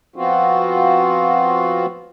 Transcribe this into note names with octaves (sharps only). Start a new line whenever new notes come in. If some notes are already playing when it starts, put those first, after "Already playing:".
F3 B3 C4 F4 F#4 C5